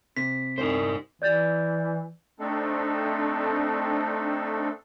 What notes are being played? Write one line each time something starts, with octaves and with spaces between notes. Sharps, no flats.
C3 B6
C2 D#4 C5
E3 D5 G6 A6
A3 C4 D4 D#4 A4